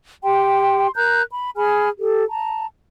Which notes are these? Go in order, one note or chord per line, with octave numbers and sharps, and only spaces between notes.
G4 G5 C6
A#4 A#5 F#6 G6
B5
G#4 G#5 B5 F6
G4 A4
A5 A#5